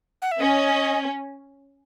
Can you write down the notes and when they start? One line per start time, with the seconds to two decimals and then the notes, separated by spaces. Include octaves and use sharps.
0.22 F#5
0.32 E5
0.40 C#4 D#5